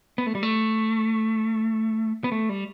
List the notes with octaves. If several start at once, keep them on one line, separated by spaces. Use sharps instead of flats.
B3
A3
G3
A3
B3
A3
G3